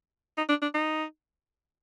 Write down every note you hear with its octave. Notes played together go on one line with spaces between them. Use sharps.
D#4
D4
D4
D#4